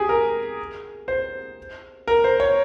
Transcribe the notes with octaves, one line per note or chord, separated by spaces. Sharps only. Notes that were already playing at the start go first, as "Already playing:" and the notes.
Already playing: G4 G#4
A#4
C5
A#4
C5
C#5